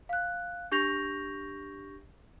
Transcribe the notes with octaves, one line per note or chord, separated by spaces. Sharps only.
F5 F#6
D4 G4 C#6 G6 A#6 F7